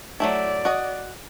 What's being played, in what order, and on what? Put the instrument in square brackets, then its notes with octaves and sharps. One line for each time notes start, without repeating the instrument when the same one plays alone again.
[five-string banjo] F#3 A3 E4 [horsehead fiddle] D5
[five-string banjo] F#4 D#5